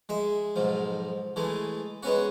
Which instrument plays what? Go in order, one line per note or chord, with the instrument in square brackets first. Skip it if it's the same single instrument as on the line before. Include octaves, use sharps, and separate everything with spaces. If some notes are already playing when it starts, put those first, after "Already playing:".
[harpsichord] G#3 E5
B1 G#2 F3
E3 G#3 A3
G#3 B3 C#4 F#4